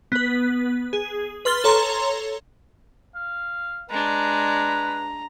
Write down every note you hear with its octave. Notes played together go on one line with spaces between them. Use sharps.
B3 B4
G#4
B4 C6 F6 A6 G7
A4 C#5 A#5 C6
F5
G#3 D4 B4 A#5